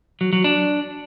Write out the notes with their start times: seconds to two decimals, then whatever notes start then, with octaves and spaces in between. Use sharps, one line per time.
0.21 F#3
0.33 F#3
0.44 D4